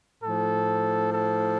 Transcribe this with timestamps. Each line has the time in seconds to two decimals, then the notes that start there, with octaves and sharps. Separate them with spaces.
0.23 A2 F3 A4
1.13 A4